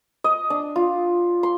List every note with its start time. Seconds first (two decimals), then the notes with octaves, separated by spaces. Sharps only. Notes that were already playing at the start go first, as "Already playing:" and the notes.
0.24 D#5
0.50 D4
0.76 F4
1.43 C6